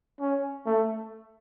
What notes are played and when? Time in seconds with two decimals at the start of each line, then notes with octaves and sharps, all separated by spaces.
0.20 C#4
0.66 A3